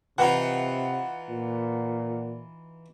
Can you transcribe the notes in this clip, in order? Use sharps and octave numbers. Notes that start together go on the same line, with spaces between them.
C3 E3 D#4 F4 F#5
A#2